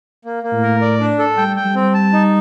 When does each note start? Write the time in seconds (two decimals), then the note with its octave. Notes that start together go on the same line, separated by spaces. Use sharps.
0.25 A#3
0.43 A#3
0.52 A2
0.62 A#4
0.81 D5
1.00 D4
1.19 A4
1.37 G3 G5
1.56 G5
1.65 G3
1.75 C4
1.94 A5
2.13 D#4